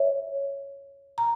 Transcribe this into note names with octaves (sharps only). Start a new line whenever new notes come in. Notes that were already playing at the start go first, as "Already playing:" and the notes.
Already playing: C#5 E5
A#5